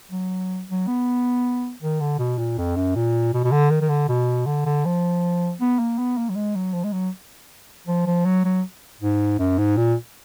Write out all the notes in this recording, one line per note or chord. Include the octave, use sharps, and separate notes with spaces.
F#3
F#3
B3
D#3
D3
B2
A#2
F2
F#2
A#2
B2
B2
D3
D#3
D#3
D3
B2
D3
D3
F3
B3
A#3
B3
A#3
F#3
G#3
F#3
F3
G#3
F#3
F3
F3
F#3
F#3
G#2
F#2
G#2
A#2